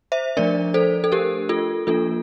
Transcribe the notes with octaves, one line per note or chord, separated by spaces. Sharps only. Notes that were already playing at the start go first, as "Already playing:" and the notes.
C5 E5
F3 A3 D4 A#4 D5
A4 C5
A4
G4 A#4
F4 A4
F3 A#3 D4 F4 A4